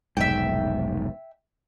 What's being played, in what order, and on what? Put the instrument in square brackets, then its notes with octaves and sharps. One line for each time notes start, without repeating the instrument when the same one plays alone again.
[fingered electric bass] F1 B1 G#2 [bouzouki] E5 G5